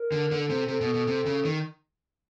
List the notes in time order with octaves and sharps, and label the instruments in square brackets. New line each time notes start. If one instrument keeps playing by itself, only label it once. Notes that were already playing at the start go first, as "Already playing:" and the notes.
Already playing: [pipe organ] A#4
[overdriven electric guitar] D3
[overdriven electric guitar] D3 [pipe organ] A4
[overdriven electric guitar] C3
[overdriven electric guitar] C3 [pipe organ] A4
[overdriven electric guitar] B2
B2
C3
C#3
D#3